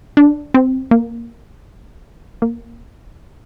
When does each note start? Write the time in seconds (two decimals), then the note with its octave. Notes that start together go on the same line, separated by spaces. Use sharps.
0.17 D4
0.54 C4
0.91 A#3
2.42 A#3